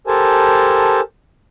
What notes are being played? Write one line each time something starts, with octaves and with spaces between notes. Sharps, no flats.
G4 A4 A#4 C5 G#5 A5